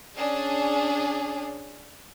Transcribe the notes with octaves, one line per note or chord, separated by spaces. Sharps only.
C#4 D4 G#4